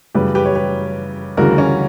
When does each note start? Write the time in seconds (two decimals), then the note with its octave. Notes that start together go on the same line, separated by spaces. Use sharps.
0.15 F#2 C#3 E3 G3 G4 B4
0.35 G4 B4
0.45 C#5
0.56 G4 B4
1.37 D2 C#3 E3 G3 F#4 A#4
1.58 C#4